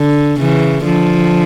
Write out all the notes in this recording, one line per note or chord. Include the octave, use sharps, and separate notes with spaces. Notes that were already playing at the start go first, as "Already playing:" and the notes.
Already playing: D3
C#3 E3
D3 F3